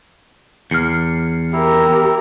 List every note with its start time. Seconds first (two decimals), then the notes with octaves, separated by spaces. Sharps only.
0.71 E2 F6 C7 C#7
1.53 E4 G4 A#4